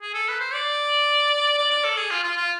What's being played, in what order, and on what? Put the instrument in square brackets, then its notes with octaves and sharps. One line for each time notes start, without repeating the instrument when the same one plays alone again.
[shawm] G#4
A4
B4
C5
D5
D5
D5
A4
G#4
F4
F4
F4